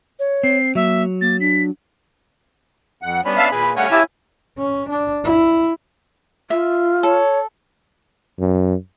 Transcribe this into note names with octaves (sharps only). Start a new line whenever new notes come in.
C#5
C4 C7
F#3 A#3 E5
A#3 A6
D4 B6
F2 F#5
G3 B3 C#4 D4 B5
E5 F5 A5
A#2 G#4 B4
G3 A3 C#5 F5 F#5 G#5
E4 G4 A5
C#4
D4
E4
F4 E5
A4 C#5
F#2